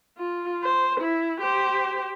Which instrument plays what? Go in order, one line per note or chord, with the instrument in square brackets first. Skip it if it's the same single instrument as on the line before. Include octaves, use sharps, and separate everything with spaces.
[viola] F4
C5
E4
G4 C5